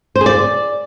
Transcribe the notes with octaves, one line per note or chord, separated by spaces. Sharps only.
C5
G#4
D5